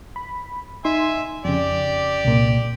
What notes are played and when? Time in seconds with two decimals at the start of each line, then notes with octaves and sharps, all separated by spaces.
0.16 B5
0.85 D#4 E5 G#5 C6
1.45 F2 C#3 G4 D5
2.24 C2 A#2